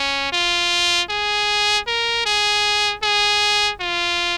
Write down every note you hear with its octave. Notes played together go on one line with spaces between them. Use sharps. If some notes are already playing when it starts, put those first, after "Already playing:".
Already playing: C#4
F4
G#4
A#4
G#4
G#4
F4